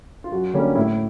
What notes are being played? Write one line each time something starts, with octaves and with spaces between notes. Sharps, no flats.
F4
F#2 F#4
D3 G3 A#3 C#4
A2 E4